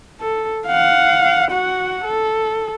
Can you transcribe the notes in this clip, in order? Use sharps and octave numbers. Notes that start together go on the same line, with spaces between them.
A4
F5 F#5
F#4 F#5
A4